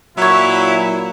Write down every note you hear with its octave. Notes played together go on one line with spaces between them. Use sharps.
A#2 F#3 E4 C#5 E5